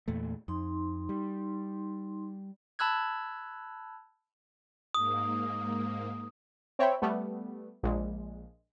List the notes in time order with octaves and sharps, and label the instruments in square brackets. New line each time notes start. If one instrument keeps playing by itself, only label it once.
[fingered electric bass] E2 A#2 A3
[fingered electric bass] F2 [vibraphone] D#4 C6
[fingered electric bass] G3
[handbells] A5 B5 E6 F#6 G#6
[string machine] G#2 A#3 [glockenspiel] D#6
[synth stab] C4 C#5 E5 G5 B5
G3 A3 B3
A#1 G#3